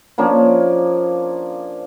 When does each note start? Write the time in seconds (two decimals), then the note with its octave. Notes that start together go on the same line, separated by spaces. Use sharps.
0.18 F3 A#3 C#4 D4